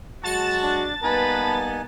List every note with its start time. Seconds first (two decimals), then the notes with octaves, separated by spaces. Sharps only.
0.24 F#3 G#3 F#4 A5 A6
0.63 D4
1.04 G3 A#3 B3 D#4 B4 G#5